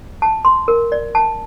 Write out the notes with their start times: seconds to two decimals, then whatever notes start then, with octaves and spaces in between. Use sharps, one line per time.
0.22 A5
0.45 C6
0.68 A#4
0.92 D5
1.15 A5